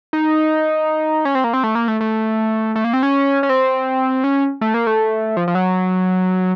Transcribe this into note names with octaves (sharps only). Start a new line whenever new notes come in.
D#4
C#4
C4
A#3
C4
A3
A#3
A3
A3
A3
A#3
C4
C#4
C#4
C4
C#4
A3
A#3
A3
F3
F3
F#3